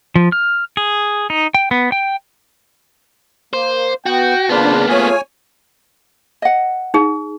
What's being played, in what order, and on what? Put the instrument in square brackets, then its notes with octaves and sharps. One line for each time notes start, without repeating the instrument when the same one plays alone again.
[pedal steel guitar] F3
F6
G#4
D#4
G5
B3
G5
[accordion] A#3 [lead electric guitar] C5
[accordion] B3 [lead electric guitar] F#4 [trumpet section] G5
[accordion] C#3 D4 [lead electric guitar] A#3 B3 [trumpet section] F4 B4 C5
[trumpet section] A3 F4 G#4 [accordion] C#5 G#5
[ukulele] D#5 F#5
[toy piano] D#4 G#4